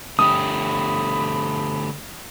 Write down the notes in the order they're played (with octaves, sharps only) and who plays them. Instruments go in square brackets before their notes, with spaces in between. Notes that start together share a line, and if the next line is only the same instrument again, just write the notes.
[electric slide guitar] D3 A3 G4 [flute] B5 [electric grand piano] D#6